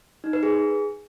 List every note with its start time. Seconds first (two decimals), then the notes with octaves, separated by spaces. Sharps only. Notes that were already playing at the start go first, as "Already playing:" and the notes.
0.24 D#4
0.33 B4
0.43 G#4